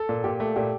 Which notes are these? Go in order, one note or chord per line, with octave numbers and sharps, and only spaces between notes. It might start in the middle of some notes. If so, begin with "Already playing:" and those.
Already playing: A4
A#2
A#2 G4
A3
A#2 G4